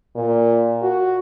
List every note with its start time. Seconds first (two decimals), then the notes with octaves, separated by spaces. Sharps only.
0.16 A#2
0.82 F#4